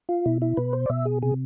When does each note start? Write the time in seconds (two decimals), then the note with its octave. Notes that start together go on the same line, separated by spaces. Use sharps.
0.09 F4
0.26 B2 E4
0.42 E4
0.57 B2 B4
0.73 C5
0.86 D5
0.90 B2 E5
1.05 G#4
1.22 C3 G#4